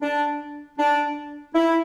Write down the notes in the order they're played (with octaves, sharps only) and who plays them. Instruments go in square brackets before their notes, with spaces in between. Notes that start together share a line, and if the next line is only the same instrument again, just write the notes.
[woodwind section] D4
D4
E4